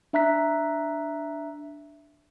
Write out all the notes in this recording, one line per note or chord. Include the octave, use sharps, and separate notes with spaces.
D4 E5 A#5 F#6 B6